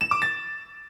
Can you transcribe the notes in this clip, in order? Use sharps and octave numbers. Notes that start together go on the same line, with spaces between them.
E7
D6
A6